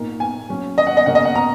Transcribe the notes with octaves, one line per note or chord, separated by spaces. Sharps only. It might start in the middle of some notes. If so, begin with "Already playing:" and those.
Already playing: A#2 A#3 D#4
G#5
F#3 C#4
D#5
F#5
D#5
C#3 A#3 C#4 F#5
D#5
F#5
A#5